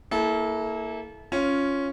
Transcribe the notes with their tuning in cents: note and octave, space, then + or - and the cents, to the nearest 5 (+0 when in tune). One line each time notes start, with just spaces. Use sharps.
A#3 -5 E4 -10 A4 -35
C#4 +0 F4 +0